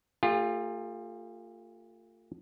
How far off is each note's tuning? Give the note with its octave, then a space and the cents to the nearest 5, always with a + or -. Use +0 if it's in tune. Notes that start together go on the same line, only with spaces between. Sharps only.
A3 +40 F4 +15 G#4 -45